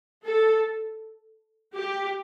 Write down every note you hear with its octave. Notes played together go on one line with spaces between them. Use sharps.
A4
G4